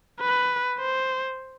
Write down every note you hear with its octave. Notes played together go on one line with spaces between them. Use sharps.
B4
C5